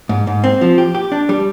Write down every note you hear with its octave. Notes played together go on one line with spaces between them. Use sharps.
G#2
G#2
C4
F3
G4
G4
D4
G3